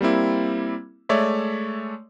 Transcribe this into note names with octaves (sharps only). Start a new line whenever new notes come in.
G3 A#3 C4 E4
G#3 A3 C#5 D5 E5